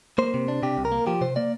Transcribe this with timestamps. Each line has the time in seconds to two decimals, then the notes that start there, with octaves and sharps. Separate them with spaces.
0.18 A#3 C5
0.34 C3
0.48 D4
0.63 C3 G4
0.78 C2
0.85 A#4
0.92 A#3
1.07 F3 G4
1.21 C3 C5
1.36 A#3 D5